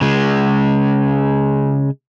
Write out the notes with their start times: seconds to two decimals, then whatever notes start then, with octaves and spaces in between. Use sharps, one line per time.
0.01 C#3 G#3